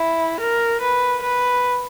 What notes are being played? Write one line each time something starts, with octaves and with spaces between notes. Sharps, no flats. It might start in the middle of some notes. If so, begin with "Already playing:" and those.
Already playing: E4
A#4
B4
B4